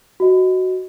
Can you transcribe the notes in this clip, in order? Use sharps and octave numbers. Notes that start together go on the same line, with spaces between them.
F#4 D#5